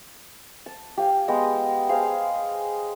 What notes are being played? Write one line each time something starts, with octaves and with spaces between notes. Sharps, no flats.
A5
G4 F5 G#5
G#3 B3 G4 D#5
G#4 C5 F5